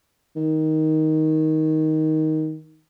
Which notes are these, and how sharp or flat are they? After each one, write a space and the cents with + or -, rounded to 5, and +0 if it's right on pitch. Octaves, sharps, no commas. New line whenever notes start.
D#3 +10